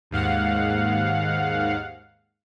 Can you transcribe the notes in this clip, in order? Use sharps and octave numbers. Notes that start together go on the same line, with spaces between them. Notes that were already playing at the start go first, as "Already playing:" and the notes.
D#2 G#2 F5 F#5